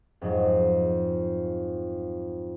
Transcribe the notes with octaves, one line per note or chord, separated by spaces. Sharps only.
F2 G#2 F#3